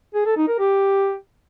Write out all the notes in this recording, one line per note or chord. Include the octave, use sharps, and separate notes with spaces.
G#4
A4
D#4
A#4
G4